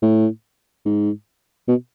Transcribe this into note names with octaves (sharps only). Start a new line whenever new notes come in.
A2
G#2
B2